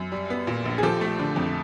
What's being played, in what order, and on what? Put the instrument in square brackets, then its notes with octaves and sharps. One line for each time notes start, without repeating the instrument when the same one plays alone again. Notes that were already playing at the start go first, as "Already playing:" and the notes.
Already playing: [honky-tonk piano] F#2
G3
B3
A#2
A#1
G#4
F3 G4 A4
A3
D3
F2